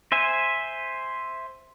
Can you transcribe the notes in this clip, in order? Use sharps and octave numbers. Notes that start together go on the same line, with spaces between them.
C5 E5 G#5